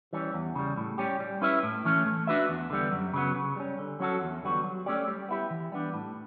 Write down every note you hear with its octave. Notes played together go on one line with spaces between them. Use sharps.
E3 G3 C#4
E2
C#3 G3
A2
G3 C#4 G4
G3
C#4 E4 B4 E5
A2
E3 A3 C#4
A3
D4 F#4 B4 E5
E2
D3 G3 B3
F#2
C#3 F#3 B3
C#3
G3 C#4
D3
F#3 C#4 F#4 A4
E2
D3 G3 B3 F#4
F#3
A3 C#4 G4 D5
G3
B3 E4 G4
E3
G3 B3 D4
A2